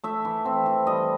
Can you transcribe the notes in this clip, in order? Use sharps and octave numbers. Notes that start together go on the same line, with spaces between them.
A3 E5
E3
C4
E3
G3 D#5